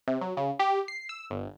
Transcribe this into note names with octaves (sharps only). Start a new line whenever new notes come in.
C3
F#3
C#3
G4
C7
E6
G1